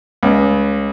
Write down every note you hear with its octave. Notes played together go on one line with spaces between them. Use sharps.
C#2